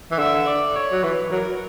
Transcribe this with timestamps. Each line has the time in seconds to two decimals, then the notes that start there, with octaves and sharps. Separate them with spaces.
0.11 E3
0.18 D3 E5
0.47 D5
0.76 C#5
0.92 F#3
1.03 E3 B4
1.31 F#3 A#4